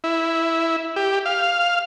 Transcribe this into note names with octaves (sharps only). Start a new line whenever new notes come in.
E4
G4
F5